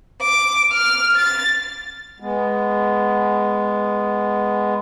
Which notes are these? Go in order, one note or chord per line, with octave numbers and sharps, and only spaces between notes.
D6
F6
A6
G#3 B3